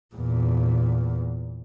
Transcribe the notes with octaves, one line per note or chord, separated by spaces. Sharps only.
E2 A#2